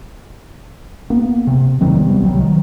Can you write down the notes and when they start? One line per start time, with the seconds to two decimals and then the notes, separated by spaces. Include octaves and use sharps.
1.10 A#3 B3
1.47 C3
1.81 E2 D#3 F#3 C4
1.95 C2 C3 G3 B3
2.23 C2 F#3 G3
2.39 D#3 F#3